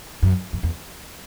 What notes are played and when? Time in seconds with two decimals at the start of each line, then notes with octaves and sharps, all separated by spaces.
0.22 F#2
0.53 F#2
0.63 E2